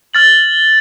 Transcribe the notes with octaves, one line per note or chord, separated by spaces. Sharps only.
F6 A6 F#7